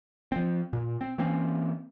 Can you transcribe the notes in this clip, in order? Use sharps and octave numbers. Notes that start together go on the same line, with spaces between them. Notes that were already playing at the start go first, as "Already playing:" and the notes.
F3 C4
A#2
C4
E3 A#3 C4 C#4